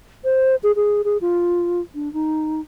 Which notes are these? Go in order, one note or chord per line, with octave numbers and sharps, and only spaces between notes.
C5
G#4
G#4
G#4
F4
D4
D#4